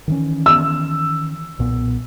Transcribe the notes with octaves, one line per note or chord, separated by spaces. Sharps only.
D#3 E3 C#4
E6
B1 A#2 B3